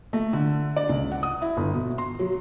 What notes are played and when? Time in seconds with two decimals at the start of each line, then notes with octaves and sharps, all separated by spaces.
0.13 A3
0.33 D3
0.76 D5
0.89 C#2
1.12 F#5
1.23 D#6
1.42 E4
1.57 G1
1.74 B2
1.98 C6
2.19 F#3